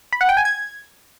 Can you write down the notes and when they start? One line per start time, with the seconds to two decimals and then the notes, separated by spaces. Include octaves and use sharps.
0.13 B5
0.21 F#5
0.29 G5
0.37 G#5
0.45 G#6